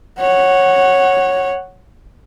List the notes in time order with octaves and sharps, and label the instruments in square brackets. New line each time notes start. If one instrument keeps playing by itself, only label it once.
[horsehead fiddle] C#5 F#5